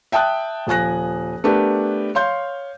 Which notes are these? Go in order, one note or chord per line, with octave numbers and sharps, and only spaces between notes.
E5 G5 A5 D#6 F#6
D#1 F3 G#5 F#6 A#6
A3 B3 D4 G4 A#4
C#5 F5 C6 G6